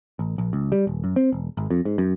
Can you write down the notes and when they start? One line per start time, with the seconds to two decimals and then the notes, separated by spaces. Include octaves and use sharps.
0.19 A1
0.38 A#1
0.53 C#2
0.72 G3
0.87 D#1
1.04 F#2
1.16 C4
1.32 E1
1.57 G#1
1.71 F2
1.85 G#2
1.98 F#2